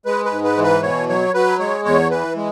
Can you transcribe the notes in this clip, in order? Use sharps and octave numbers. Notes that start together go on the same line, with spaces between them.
G#3 B4
B4
G#2
B4
E3
B4
B2 C#5
F#3 C#5
F#3 B4
G#3 C#5
E2 C#5
E3 B4
G#3